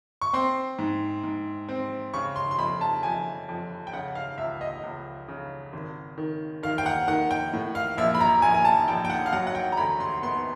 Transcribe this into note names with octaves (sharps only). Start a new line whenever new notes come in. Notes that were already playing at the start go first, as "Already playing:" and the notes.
C#6
C4 C6
G#2
G#2
C4
C#3 C#6
C6
C6
F2 B5
A5
F2 G#5
F2
G5
C#3 F#5
F5
C#2 E5
D#5
C#2
C#3
G#1
D#3
D#3 F5
G5
F#5
D#3 F#5
G5
A2
F5
A#1 E5
B5
A#5
A#1 G#5
G#5
A5
A#1 G5
G5
F#5
F5
F#3 F#5
F#5
G5
A#5
D2 B5
C6
B3 C6